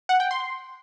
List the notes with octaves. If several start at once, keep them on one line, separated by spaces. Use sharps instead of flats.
F#5
G5
C6